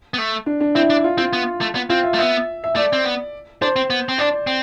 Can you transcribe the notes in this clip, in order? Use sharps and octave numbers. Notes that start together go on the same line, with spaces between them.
B3
A3
D4
D4
C4 E4
D4
F4
C4 F4
B3
A3
B3
C4 F4
E5
A3
B3 E5
E5
A3 D5
C4
B3
D4 C5
C4
B3
C4
D4 D5
C4